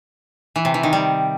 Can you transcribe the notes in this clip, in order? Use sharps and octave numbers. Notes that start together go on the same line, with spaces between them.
E3
C3
E3
D#3
G3